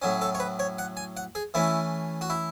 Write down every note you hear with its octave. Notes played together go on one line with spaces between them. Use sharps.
A2 F#3 C#4
A4
C#5
B4
C#5
F#5
G#5
F#5
G#4
E3 A3 C#4 E4
F#4
E4